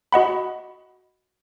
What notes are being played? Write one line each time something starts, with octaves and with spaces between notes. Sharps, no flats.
F#4 D#5 F#5 B5